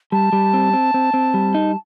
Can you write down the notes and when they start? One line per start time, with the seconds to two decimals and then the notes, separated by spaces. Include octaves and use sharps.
0.12 G3 A5
0.33 G3
0.54 C4
0.73 C4
0.94 C4
1.14 C4
1.34 G3
1.54 D#4